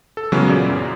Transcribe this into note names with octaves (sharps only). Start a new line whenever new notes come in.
A4
C#3 E3 F#3 G#3 B3
A#2 C#4 D5
F#2